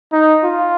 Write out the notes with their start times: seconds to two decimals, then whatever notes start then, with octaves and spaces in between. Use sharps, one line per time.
0.13 D#4
0.44 F4